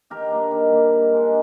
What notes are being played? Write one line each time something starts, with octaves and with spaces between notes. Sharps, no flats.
D#3 G4 A#4
G3 A#3 D4
D#3
G3 A#3 D4
D#3
G#3 D4